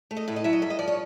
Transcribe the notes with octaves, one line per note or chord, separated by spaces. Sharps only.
A3
D#5
A2 E5
D#5
F#3 E5
D#5
G2 E5
D#5
F3 D5
C#5